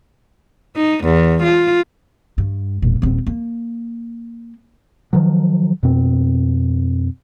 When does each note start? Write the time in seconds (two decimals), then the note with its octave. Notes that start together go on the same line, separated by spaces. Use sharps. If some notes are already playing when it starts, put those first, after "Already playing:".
0.76 D#4
1.05 E2
1.43 F4
2.38 G2
2.82 E1 A#2
3.02 D#1 C4
3.27 A#3
5.13 D#3 F3 F#3
5.83 F2 B2 C4